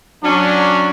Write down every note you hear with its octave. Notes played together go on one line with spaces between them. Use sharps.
F#3 C#4 D4